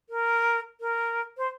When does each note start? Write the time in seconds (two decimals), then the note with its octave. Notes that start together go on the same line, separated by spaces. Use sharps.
0.09 A#4
0.81 A#4
1.37 C5